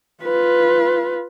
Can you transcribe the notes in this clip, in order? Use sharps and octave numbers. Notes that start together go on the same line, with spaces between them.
F4 B4